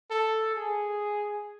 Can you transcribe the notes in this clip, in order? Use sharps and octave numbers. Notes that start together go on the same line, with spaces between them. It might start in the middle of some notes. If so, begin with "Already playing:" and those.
A4
G#4